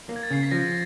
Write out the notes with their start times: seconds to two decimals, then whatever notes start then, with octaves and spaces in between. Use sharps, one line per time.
0.09 A#3
0.16 G#6
0.23 A6
0.30 C#3 C7
0.43 B6
0.51 F3 A#6